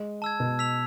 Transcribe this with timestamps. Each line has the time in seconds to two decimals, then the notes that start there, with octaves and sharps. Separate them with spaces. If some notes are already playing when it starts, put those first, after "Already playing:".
Already playing: G#3
0.22 A5 E6 G#6
0.40 B2
0.59 E6 B6 F7